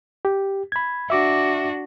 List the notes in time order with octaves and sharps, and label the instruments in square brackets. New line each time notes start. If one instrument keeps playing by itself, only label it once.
[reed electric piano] G4
B5 G#6
[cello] D4 F#4 [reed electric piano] E5 D6